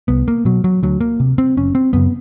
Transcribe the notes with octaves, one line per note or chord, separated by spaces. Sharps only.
C2 B3
A#3
B2 F#3
F#3
D2 F#3
A#3
C3
C4
F#1 C#4
C4
F#2 C#3 B3